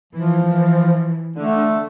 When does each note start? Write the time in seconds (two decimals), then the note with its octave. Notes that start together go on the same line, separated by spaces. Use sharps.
0.13 E3 F3
0.44 E3
1.36 D3 A3